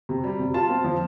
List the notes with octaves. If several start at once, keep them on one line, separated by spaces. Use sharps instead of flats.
C3
G3
C3
F4 A5
C4
F3